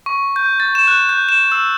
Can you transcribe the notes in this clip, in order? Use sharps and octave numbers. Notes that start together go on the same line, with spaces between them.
C#6
G6
A6
E7
F#6
G6
E7
E6